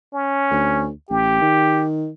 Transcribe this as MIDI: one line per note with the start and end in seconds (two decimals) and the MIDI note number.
0.13 0.87 61
0.51 0.91 38
1.10 1.38 33
1.10 1.85 67
1.41 2.10 51